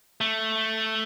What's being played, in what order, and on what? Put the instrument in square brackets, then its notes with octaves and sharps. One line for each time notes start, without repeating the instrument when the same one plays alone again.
[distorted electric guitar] A3